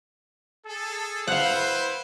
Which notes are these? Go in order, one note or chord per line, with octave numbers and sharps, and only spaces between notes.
G#4 A4
E4 B4 C5 F5 F#5